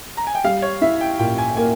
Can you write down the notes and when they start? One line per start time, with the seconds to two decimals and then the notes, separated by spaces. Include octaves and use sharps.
0.17 A#5
0.27 G#5
0.35 G5
0.44 G3 F5
0.62 C#5
0.82 E4 E5
1.01 G5
1.19 A#2 G5
1.38 G#5
1.56 A#3 G#5